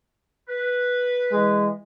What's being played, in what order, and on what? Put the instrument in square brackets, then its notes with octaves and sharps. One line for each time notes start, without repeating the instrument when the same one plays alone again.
[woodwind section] B4
[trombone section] E3 G#3